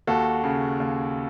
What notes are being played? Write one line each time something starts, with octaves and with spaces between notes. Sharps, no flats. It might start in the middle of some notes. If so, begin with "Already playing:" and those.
D#2 F#4 A4
C#3
D#2